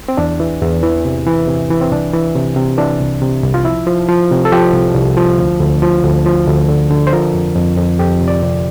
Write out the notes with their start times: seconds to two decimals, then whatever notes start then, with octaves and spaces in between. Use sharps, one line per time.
0.08 C4
0.17 E2 D4
0.40 E3
0.62 E2
0.83 E3
1.05 C3
1.26 E3
1.48 C3
1.70 E3
1.81 C4
1.92 C2 D4
2.13 E3
2.36 C3
2.56 C3
2.78 E3 D4
3.00 C2
3.22 C3
3.43 C2
3.54 F4
3.65 F3 E4
3.87 F3
4.08 F3
4.31 C3
4.45 A4
4.52 F3 G4
4.74 C2
4.95 C2
5.17 F3
5.38 D2
5.60 D2
5.82 F3
6.04 D2
6.26 F3
6.47 D2
6.69 D3
6.91 D3
7.07 C5
7.13 F3 A#4
7.34 F2
7.56 F2
7.78 F2
7.99 F2 G4
8.21 C3
8.28 D5
8.43 C3